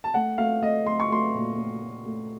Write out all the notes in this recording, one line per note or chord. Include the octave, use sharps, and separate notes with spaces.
A5
A3 F#5
A3 F5
A3 D#5
A3 C6
C#6
A3 C6
A#2
A3
A3
A3